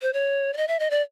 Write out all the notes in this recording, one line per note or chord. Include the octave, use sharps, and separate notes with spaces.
C5
C#5
D5
D#5
E5
D#5
D5